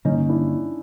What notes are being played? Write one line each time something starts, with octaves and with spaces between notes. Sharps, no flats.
G2 D3 G3 A#3 C#4 D#4
D4 E4